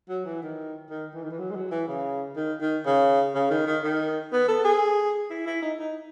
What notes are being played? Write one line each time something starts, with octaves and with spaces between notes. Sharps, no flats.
F#3
E3
D#3
D#3
E3
D#3
E3
F#3
G#3
F#3
E3
C#3
D#3
D#3
C#3
C#3
D#3
D#3
D#3
B3
A4
G#4
E4
E4
D#4
D#4